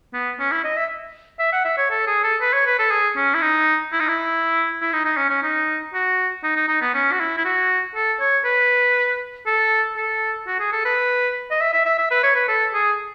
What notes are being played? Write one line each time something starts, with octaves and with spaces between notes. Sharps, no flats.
B3
C#4
E4
D#5
E5
E5
F#5
E5
C#5
A4
G#4
A4
B4
C#5
B4
A4
G#4
C#4
E4
D#4
E4
D#4
E4
E4
D#4
D#4
C#4
C#4
D#4
F#4
D#4
D#4
D#4
B3
C#4
F#4
E4
E4
F#4
A4
C#5
B4
A4
A4
F#4
G#4
A4
B4
D#5
E5
E5
E5
E5
B4
C#5
B4
A4
G#4